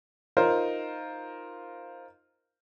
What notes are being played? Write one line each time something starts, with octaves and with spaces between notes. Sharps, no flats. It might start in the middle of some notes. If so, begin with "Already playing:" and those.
D#4 F4 A#4 C5